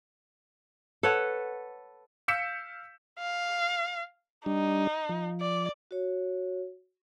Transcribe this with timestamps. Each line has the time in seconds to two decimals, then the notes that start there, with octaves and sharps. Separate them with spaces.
1.03 A4 B4 C#5 F#5
2.28 F5 E6 G6 B6 C#7 E7
3.19 F5
4.46 G3 D4 D#4
5.09 F3
5.41 D5
5.91 F#4 C#5